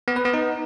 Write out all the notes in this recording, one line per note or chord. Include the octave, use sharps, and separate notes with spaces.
B3
B4
B3
D#4